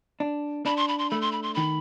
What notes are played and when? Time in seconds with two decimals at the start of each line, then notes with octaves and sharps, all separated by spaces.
0.20 D4
0.66 D4 B5
0.77 C6
0.88 B5
0.98 C6
1.10 A3 B5
1.21 C6
1.32 B5
1.43 C6
1.54 D#3 B5